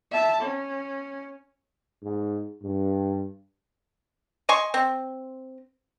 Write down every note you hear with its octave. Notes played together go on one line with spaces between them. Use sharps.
E5 A5
C#4
G#2
G2
D#5 G#5 C6 C#6
C4